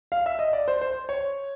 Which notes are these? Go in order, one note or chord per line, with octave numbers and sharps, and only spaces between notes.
F5
E5
D#5
D5
C5
C5
C#5